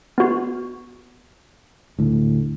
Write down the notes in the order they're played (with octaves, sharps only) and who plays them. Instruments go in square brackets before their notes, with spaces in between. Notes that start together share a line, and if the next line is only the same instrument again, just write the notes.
[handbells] B3 F#4
[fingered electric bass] D2 A2